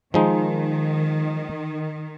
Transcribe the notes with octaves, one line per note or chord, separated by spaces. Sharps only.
D#3 F3 G#3 D#4